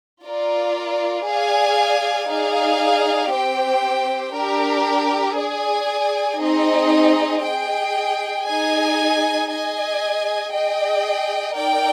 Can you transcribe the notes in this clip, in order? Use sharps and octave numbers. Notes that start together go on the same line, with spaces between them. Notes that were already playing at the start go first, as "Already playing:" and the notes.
F4 A#4 D5
G#4 D5 F5 G#5
D#4 G#4 D5 F5
C4 G4 C5 G5
D4 G4 A#4
G#4 D5 G#5
C4 D#4 G#4 D#5
G#4 D#5 G5
D#4 G#4 D#5 G#5
G#4 D#5 G#5
G#4 D#5 G5
D#4 A#4 D5 G5